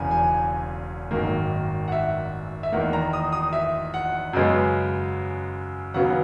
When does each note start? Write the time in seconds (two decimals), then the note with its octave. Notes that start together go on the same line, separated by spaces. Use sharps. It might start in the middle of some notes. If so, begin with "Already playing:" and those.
Already playing: E1 E2 C#3 G#5
0.11 G#5
1.11 G#1 F#2 D#3 A#3
1.88 F#5
1.92 E5
2.63 E5
2.72 E2 D#3 A#3 F#5
2.93 A#5
3.13 D#6
3.32 D#6
3.53 E5
3.94 F#5
4.33 F#2 C#3 G#3 B3
5.94 D#2 C#3 F#3 B3 F#5